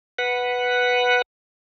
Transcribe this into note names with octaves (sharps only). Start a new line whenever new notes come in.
B4 F#5